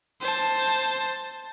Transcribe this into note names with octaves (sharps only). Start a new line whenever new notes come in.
C5 A5